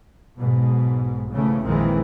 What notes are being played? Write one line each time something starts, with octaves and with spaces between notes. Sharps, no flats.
B1 G#2 B2
G#2 C#3 E3 A3
A#1 F2 D#3 E3 G#3 C4